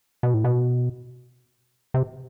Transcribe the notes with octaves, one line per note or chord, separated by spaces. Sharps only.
B2
A2
B2
C3